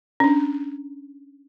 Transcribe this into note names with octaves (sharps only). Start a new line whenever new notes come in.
C#4 D4